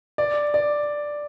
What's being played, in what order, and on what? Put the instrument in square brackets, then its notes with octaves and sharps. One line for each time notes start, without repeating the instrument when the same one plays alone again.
[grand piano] D5
D5